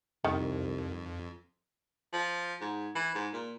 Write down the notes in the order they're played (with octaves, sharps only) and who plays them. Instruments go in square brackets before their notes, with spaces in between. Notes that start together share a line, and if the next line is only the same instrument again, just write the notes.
[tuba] C2 [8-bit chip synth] F2 [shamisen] D#3
[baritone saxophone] F3
G#2
E3
G#2
A#2